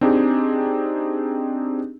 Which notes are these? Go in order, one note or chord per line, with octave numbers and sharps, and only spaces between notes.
C4 D4 D#4 G4 G#4